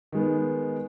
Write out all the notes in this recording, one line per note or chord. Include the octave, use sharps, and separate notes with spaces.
D#3 G#3 B3